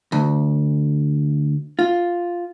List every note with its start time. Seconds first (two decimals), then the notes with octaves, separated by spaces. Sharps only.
0.12 D2
1.79 F4